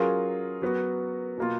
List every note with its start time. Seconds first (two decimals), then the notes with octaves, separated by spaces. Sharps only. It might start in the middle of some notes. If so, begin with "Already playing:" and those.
Already playing: F#3 C#4 F4 G#4 A#4
0.62 F#3 B3 F#4
1.38 B2 A#3 F4